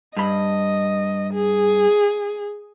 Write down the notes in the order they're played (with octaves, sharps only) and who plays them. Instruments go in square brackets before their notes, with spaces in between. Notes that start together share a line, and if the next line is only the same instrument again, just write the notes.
[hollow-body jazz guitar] G2 B5 [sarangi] D#5
[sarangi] G#4